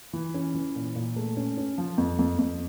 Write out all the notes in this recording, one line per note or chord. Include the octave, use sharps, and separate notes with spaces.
E3
C#4
E3
A#2
A#2
A3
C#4
C#4
F3
F2
F2
F2